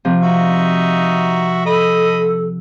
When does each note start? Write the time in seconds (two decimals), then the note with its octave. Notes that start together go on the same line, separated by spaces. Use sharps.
0.05 C3 F3
0.22 D#4 F#4 E5
1.66 A4 D#5 B5